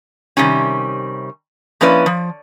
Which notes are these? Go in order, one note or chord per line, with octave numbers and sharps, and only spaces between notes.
C3 D#3 G3 C#4
F3 A#3 C#4 E4 B4 D5
F3